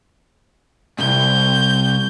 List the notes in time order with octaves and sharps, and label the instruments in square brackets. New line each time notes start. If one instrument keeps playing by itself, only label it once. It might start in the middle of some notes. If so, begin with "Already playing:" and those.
[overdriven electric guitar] C2 G#2 [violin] G6